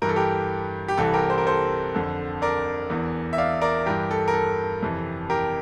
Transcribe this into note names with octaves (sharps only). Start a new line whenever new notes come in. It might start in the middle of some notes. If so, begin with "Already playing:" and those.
G2 E3 A#4
A4
G4 A#4
G4
C2 C3 E3 A4
G4 A#4
C5
A#4
A4 C5
F2 D3
A#4 D5
E2 E3
E5
D5 F5
A#4 D5
G2 E3 G4 A#4
A4
A#4
A4
F2 C3 E3
G4 A#4